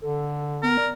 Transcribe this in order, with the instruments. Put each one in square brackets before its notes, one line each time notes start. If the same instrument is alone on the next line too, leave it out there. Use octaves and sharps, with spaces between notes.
[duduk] D3 [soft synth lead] A4
[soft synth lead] B3 [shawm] A#4
[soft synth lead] D5